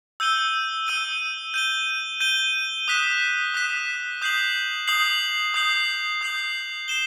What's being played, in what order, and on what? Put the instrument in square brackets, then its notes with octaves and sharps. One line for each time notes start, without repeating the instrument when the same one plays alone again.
[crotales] E6 G6 D#7 G7
E6 G6 D#7 G7
G6 D#7 G7
G6 D#7 G7
D#6 F#6 B6 E7
D#6 F#6 B6 E7
D#6 G6 C7 F#7
D#6 G6 C7 F#7
D#6 G6 C7 F#7
D#6 G6 C7 F#7
C7 E7 G7